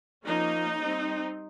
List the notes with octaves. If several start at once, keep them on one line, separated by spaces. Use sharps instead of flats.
F3 A#3 C#4 D#4
G3 C4